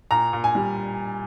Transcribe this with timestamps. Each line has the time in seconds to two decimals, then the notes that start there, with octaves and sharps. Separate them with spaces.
0.11 A#2 A#5
0.33 A#2
0.44 G#5
0.55 G3